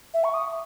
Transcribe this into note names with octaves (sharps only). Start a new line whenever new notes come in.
E5
C#6
D#6